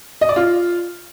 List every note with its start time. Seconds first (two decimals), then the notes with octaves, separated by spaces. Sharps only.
0.21 D#5
0.29 D5
0.36 F4